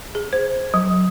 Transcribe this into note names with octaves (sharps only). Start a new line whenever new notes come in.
G#4
C5
F#3